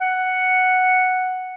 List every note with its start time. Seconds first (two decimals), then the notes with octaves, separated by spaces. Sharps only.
0.01 F#5